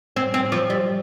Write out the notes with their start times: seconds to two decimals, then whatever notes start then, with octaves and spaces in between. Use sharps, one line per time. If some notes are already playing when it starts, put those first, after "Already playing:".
0.16 C4
0.34 C4
0.52 F3
0.70 G3